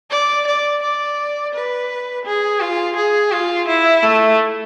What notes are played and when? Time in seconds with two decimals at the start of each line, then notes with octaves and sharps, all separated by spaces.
0.11 D5
0.47 D5
0.82 D5
1.54 B4
2.25 G#4
2.60 F4
2.97 G#4
3.32 F4
3.68 E4
4.03 A3